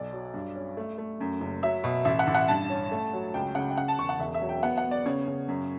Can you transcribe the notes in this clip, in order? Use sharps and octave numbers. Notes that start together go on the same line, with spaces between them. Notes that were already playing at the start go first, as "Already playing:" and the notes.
Already playing: B1 D5
F#3
G2
C#4
A3
A3
F#2
F#1
F#3 E5
B2
A1 E5
F#5
A1
F#5
G2 A5
C#4
A3
F#3
C#2 G5
C#3 F#5
G5
C#3 F#5
A5
E1 C#6
F#5
E1 E5
E5
F#3
G5
B3 F#5
F#5
B3
D5
C#3 C#5
C#3
F#2